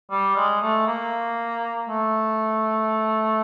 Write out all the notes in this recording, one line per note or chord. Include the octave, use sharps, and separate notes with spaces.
G3
G#3
A3
A#3
A3